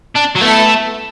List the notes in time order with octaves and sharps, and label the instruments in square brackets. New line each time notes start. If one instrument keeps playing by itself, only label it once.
[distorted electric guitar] D4
F#3
[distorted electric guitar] A3 [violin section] B3 E4 A4 E5 A5